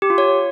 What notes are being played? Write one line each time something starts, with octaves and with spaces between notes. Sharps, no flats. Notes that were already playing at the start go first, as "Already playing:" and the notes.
G4
F4
C#5